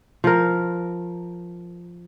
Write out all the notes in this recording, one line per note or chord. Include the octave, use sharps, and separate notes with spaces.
F3 A#4